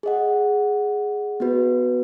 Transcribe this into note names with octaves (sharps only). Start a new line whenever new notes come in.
G#4 D#5 F#5
B3 F#4 B4